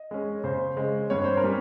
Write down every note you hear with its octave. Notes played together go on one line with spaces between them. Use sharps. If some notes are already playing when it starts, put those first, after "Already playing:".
Already playing: D#5
G#3 C#4
C#3 C5
G#3 C#4
G2 C#5
C5
A#4
G3 C#4